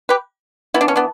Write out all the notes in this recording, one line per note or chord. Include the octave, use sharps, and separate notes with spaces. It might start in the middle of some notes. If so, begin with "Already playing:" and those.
G4 B4
E3 B3 E4
D4
C#4
B3 D4